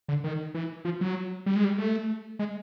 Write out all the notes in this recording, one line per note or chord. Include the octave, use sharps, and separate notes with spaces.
D3
D#3
E3
F3
F#3
G3
G#3
G3
A3
G#3